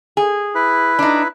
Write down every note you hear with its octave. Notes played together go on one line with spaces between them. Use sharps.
G#4
E4 B4
D4 D#4